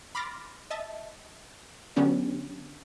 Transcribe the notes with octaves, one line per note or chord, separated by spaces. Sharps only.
B5 C6 D6 F6 A6 A#6
D#5 E5 A5
D3 F#3 B3 C#4 D4 G4